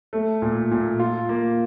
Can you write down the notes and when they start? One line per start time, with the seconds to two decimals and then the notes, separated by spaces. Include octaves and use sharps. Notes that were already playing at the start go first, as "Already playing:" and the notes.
0.13 A3
0.42 A#2
0.71 A#2
1.00 F4
1.29 A#3